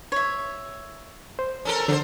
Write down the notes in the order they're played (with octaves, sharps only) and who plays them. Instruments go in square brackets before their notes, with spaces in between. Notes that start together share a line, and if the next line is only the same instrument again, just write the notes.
[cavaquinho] C#5 E5
[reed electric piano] C5
[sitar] C#4 A4 A#4
[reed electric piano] D3 [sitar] F#3 C5